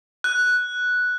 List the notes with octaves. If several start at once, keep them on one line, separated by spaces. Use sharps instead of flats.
F#6